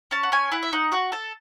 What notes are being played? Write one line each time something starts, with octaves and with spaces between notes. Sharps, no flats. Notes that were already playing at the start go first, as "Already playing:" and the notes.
C#4 A5
F#5
C#4 G#5
E4 F#5
E5
D#4 F#5
F#4 F#5
A4 A5